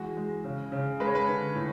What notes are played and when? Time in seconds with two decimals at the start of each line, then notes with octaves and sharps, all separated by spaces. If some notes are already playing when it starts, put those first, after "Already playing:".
Already playing: E3 G#3 F#4
0.17 G#3
0.44 C#3
0.72 C#3
1.00 G#3 B4
1.07 C#5
1.15 B4
1.28 D3
1.55 A2